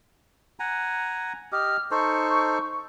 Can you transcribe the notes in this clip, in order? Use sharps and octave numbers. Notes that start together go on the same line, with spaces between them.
F#5 G#5 A#5
G4 D#5 F6
D#4 A4 C5 C#6